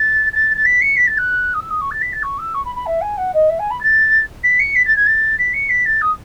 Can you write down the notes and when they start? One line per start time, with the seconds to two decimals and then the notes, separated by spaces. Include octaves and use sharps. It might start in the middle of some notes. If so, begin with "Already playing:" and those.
Already playing: A6
0.33 A6
0.55 A6
0.65 B6
0.81 C#7
0.96 B6
1.07 A6
1.17 F#6
1.54 D#6
1.59 E6
1.70 D#6
1.81 C#6
1.91 A6
2.01 B6
2.12 A6
2.22 C#6
2.38 E6
2.54 C#6
2.65 B5
2.75 B5
2.86 E5
3.01 G#5
3.17 F#5
3.34 D#5
3.49 E5
3.59 G#5
3.70 B5
3.81 A6
4.43 B6
4.59 C#7
4.75 B6
4.85 A6
4.96 G#6
5.06 A6
5.38 B6
5.53 C#7
5.69 B6
5.85 A6
6.01 D#6